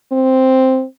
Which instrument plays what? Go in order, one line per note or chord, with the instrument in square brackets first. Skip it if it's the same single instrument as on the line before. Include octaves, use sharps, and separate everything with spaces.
[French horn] C4